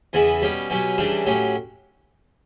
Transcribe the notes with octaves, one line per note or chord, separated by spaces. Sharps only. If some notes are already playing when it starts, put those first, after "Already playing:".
E2 C#3 E3 B3 E4
B2 G3 C#4 G4
B2 F#3 C#4 G4
C#3 E3 G3 D4 G4
A2 F#3 C#4 G4